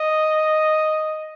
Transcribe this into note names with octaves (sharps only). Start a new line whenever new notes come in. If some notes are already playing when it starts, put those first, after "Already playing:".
Already playing: D#5